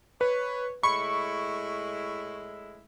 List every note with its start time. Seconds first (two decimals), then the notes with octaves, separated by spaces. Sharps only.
0.21 B4 C#5
0.83 A2 G#3 E4 B5 C#6